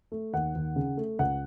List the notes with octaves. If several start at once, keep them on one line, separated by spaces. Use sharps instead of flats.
A3
D#2 F#5
D#2
C#3
A3
C#2 F#5